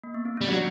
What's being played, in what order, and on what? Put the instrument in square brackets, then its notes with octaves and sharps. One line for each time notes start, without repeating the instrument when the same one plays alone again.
[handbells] A#3
B3
C4
[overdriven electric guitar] G3 [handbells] C#4
[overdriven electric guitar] F#3 [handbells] D4